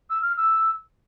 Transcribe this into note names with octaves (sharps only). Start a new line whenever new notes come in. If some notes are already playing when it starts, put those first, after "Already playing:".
E6
F6
E6